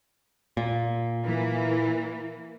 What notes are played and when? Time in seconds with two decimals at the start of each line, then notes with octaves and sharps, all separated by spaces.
0.57 A#2
1.24 E3 A#3